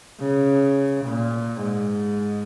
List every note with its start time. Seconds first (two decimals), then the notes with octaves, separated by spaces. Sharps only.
0.21 C#3
1.05 A#2
1.62 G#2